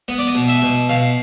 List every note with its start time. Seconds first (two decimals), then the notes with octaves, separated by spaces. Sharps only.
0.08 B3 D#5
0.18 D5
0.27 D#5
0.35 B2
0.48 E5
0.62 B2
0.89 B2 F5